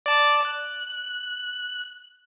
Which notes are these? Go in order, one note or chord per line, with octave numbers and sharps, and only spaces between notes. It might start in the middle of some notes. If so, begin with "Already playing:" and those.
D5 A5 D6
F#6